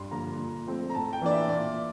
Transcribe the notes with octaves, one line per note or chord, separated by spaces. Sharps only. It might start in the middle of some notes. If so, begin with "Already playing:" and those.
Already playing: G2 C6
D3 F3 A#3 A#5
A#2
F3 A3 C4
A#5
A2 A5
G5
E3 A#3 D4 D5
E5
A#2 D5